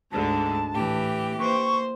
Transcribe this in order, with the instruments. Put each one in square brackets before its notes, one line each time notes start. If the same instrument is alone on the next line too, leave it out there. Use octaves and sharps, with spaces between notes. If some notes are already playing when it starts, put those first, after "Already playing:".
[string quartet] D2 G#2 D3 [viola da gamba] G#3 D4 [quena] A5
[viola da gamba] A2 E3 [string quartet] G4
[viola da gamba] A#3 C5 [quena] C#6